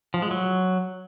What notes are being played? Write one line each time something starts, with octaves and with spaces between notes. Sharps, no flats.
F3
G#3
F#3